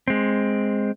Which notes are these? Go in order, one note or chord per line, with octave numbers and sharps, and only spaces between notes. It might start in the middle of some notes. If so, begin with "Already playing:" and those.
G#3 C4